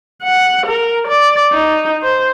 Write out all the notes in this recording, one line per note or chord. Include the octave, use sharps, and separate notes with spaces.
F#5
A#4
D5
D#4
C5